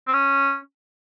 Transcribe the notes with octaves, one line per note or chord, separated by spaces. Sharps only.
C4
C#4